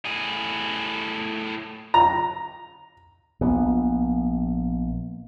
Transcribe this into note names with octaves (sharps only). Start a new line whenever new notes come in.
A2 G#4
A#5
A#1 B3